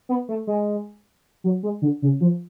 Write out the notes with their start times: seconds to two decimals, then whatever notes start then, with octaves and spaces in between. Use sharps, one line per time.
0.09 B3
0.29 A3
0.47 G#3
1.44 F#3
1.63 G#3
1.82 D3
2.02 C#3
2.21 F3